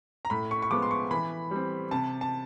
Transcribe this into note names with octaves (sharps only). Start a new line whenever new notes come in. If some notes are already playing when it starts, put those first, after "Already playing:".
A#5
A2 B5
C#6
C#6
F3 G#3 B3 D6
C6
C#6
E3 B5
G3 C4
C3 A5
A5